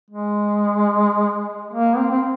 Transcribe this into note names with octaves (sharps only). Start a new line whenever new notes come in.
G#3
A#3
C4
C4